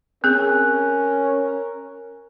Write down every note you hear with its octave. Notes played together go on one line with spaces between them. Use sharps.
C4 C#4 G#4 A#4 F#6